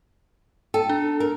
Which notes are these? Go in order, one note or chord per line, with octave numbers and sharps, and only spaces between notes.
A4 G5
D4
A#4